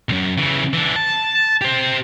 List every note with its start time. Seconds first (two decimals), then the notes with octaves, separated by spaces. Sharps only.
0.09 B1 F#2
0.38 C#3 E3
0.73 E3 D4
0.96 A5
1.61 G4 C5